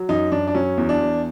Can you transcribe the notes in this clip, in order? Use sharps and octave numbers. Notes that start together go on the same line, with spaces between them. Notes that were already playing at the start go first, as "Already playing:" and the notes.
Already playing: F#3
F#2 D#4
F#2 D4
D4
F#3 C#4
E2
D4
E2